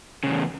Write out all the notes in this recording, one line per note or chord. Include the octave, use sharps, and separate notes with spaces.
E2 G2 C#3